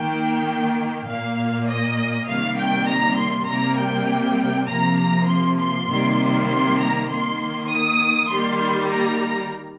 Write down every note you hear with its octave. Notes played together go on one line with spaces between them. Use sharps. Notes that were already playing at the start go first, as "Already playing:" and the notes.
Already playing: D#3 A#3 G5
A#2 A#3 F5
D#5
C3 D#3 G3 A#3 F5
G5
A#5
C6
C3 G3 A#3 A#5
G5
C3 F3 A#3 A#5
A#5
C6
C6
C3 D#3 G3 A#3
C6
A#5
D#3 A#3 C6
D#6
D#3 G3 A#3 C6
A#5